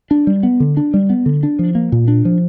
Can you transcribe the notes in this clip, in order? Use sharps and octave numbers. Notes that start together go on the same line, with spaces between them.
D4
G3
B3
D3
D4
G3
B3
D3
D4
F3
A#3
A#2
D4
F3